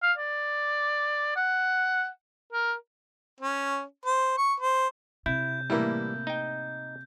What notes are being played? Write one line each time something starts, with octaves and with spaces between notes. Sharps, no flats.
F5
D5
F#5
A#4
C#4
C5
C#6
C5
C3 E4 G6
A2 E3 G3 A#3 E4
D#4 G5